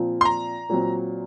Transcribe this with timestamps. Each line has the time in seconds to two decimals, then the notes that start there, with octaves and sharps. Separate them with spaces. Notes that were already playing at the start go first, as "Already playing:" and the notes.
Already playing: A#2 F3 C4
0.21 C6
0.25 A#5
0.69 A#2 F#3 C4